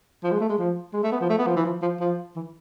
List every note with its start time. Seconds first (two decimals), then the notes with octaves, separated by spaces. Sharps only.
0.23 F3
0.31 G#3
0.41 A3
0.49 G#3
0.58 F3
0.93 G#3
1.03 A3
1.12 B3
1.21 F3
1.30 A3
1.38 B3
1.46 F3
1.56 E3
1.65 F3
1.82 F3
2.00 F3
2.36 E3